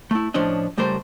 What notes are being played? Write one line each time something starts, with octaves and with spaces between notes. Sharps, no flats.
A3 E4
A2 F3 C#4 D4 D#5
C#2 G3 A3 A#4 C5